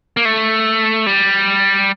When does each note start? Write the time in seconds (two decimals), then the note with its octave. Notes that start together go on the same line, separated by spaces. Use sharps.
0.17 A#3
0.25 A3
1.06 G3